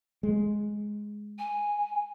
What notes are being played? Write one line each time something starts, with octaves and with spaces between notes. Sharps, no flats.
G#3
G#5